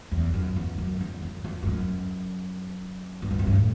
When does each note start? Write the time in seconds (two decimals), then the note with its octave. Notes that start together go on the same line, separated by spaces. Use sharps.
0.12 E2
0.34 F#2
0.56 E2
0.78 F#2
1.01 E2
1.22 F#2
1.44 E2
1.63 G2
1.67 F#2
3.22 G2
3.31 E2
3.39 F#2
3.47 G2
3.55 A2